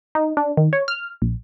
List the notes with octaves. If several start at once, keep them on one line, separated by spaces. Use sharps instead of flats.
D#4
D4
D#3
C#5
F6
A#1